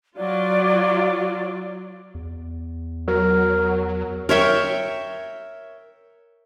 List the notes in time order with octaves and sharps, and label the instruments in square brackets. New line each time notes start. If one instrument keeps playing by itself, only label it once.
[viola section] F#3 F4 [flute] D5
[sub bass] E2
[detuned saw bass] F#3 [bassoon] A#4
[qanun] A#4 C#5 E5 G5